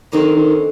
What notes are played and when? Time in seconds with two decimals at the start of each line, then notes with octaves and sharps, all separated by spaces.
0.12 D3 D#3 F#3 C4 D#4 F#4
0.36 D#3